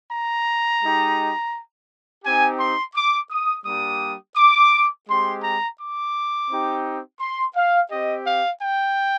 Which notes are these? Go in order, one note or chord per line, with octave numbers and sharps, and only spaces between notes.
A#5
G#3 D#4 G4
C4 D#4 G4 G#5
C6
D6
D#6
G3 A#3 D4 G4 D#6
D6
G#3 C4 G4 C6
A#5
D6
C4 D#4 G4
C6
F5
C4 G4 D#5
F5
G5